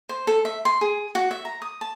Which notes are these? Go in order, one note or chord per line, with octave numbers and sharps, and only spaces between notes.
C5
A4
E5
C6
G#4
F#4
E5
A#5
D#6
A5